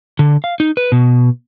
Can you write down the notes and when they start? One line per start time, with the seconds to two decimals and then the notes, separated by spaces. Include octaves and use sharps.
0.19 D3
0.44 F5
0.60 D#4
0.77 B4
0.92 B2